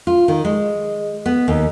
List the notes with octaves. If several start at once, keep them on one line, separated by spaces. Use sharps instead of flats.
F4
D#3
G#3
B3
D#2